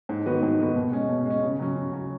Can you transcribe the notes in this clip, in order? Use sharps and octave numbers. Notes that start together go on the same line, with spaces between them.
G#2
D#3 B3 F#4 B4
G#2
D#3 B3 F#4 B4
B2
G#3 C#4
B2
G#3 C#4
C#3
F#3 C#4
C#3
F#3 C#4